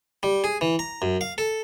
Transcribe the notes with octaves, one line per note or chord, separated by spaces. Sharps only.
G3
G#4
E3
A#5
F#2
F5
A4